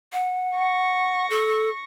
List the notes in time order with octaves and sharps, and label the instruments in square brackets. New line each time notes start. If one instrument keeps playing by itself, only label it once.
[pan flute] F#5
[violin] C#6 A#6
[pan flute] A4